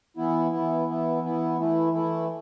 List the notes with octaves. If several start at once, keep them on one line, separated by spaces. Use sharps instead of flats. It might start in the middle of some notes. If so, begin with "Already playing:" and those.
E3 B3 E4
E3 B3 E4
E3 B3 E4
E3 B3 E4
E3 A3 E4
E3 A3 E4